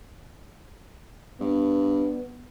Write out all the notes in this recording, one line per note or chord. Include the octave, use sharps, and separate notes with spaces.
G2 B3